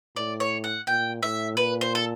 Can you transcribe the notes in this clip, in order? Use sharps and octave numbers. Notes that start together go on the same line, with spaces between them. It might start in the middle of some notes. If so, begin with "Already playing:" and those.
A2 D5
C#5
F#5
A#2 G5
A2 E5
A#2 B4
C5
A4